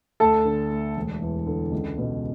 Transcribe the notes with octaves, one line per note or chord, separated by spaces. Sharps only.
D2 A4 A5
D3
A3
E1
E2
D3
C#2
B2